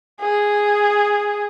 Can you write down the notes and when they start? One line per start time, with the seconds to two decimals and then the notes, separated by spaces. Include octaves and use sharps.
0.21 G#4